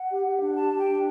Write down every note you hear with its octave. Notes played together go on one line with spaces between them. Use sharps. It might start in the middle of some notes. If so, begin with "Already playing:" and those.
Already playing: F#5
G4
G4
D4
G4 A5
G4 G5
D4